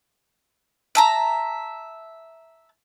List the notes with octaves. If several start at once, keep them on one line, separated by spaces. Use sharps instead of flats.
E5 A5 A#5